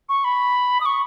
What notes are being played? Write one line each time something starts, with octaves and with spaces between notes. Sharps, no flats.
C#6
B5
D#6
C#6